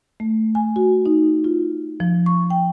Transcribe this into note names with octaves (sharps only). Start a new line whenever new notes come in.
A3
G#5
F#4
D#4
F4
F3
C#6
G5